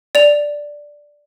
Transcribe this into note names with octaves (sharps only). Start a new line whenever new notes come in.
D5 F7